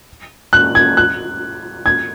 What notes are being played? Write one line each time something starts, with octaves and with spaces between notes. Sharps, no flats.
F#6
G#6
F#6
G#6